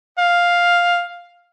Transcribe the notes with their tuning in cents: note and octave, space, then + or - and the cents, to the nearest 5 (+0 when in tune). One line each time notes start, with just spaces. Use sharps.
F5 +5